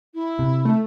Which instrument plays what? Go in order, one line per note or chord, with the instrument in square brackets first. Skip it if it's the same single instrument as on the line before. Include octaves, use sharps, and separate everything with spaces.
[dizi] E4
[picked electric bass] C3
[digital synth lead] A3